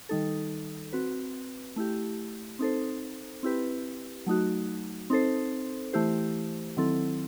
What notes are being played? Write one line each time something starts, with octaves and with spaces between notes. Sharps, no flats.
D#3 G3 D#4 A4
C4 F#4 B4
A3 E4 G4
C4 D#4 A4 C5
C4 E4 G4 B4
F#3 A3 D#4 F#4
C4 D#4 A4 C5
E3 A3 E4 G4 C5
D#3 F#3 C4 E4 A4